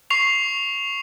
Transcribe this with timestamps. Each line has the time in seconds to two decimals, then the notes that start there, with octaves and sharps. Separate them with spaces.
0.10 C#6 C7 F7